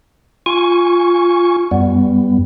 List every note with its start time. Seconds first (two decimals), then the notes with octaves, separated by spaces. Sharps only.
0.46 F4 G#5 C#6
1.71 F#2 G3 B3